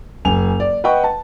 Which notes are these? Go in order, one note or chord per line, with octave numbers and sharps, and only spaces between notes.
F#1 G#5 F7
D5
B4 D#5 F#5 G5 C#6
A5